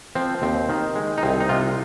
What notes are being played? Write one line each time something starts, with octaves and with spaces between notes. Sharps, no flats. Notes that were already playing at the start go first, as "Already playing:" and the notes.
F3 C4
D#2 C4
D#3
G#3
D#4
C2 C4
D#4
C3 F4